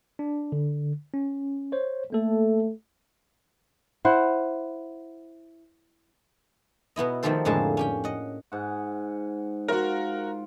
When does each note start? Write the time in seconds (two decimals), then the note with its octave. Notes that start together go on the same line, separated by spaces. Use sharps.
0.19 D4
0.52 D3
1.14 C#4
1.72 C5 C#5
2.13 A3 A#3 A4
4.05 E4 C5 F#5
6.96 B2 B3 E4 D#5
7.23 D#3 F3 A3 G4 A4 C5
7.45 F2 A2 D3 G#3 A#3 A5
7.77 C#4 G4 G5
8.04 D#5 F#5
8.52 G#2 F#5
9.68 F4 F#4 A#4 F5 F#5